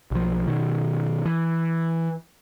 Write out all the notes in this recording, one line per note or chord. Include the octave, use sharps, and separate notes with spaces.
B1 F3
B2 D#3
E3